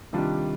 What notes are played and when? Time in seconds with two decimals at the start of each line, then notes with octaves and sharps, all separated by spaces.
0.13 C3 D#3 G3 D4 F4